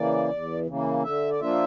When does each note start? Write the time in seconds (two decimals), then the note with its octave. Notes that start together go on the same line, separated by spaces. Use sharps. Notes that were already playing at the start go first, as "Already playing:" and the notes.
Already playing: C#3 E3 A#3 D5
0.30 E2
0.66 C#3 E3 A#3
1.03 D3 E5
1.30 D5
1.40 F3 A#3 D4 F4 E5